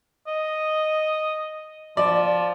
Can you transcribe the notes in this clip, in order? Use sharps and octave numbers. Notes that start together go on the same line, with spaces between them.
D#5
F3 D5